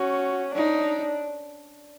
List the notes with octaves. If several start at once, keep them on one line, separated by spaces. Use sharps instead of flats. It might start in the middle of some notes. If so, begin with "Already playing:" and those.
Already playing: C#4 F#4
D4 D#4